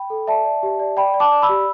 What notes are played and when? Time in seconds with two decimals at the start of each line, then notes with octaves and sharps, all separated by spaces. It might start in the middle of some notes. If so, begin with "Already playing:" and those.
Already playing: G5 B5
0.10 A4
0.27 D5 E5 A5
0.45 D5
0.63 G4
0.80 D5
0.97 D5 G5 B5
1.14 D5
1.20 A5 D6
1.32 D5
1.42 B5 E6
1.49 G4